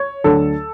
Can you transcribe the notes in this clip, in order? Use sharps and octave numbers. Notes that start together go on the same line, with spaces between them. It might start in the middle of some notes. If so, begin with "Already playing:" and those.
Already playing: C#5
D2 D3 F#3 A4